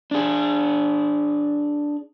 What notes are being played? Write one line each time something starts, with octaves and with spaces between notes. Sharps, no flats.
D4 G#4